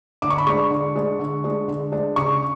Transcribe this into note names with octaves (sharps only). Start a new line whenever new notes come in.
D3 D6
C#6
B5
G#3 D4 C#6
D3
G#3 D4
D3
G#3 D4
D3
G#3 D4
C#3 C#6